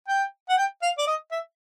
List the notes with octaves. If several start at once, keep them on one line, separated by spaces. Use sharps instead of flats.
G5
F#5
G5
F5
D5
D#5
E5